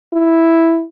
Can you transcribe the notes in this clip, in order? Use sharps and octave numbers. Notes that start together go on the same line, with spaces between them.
E4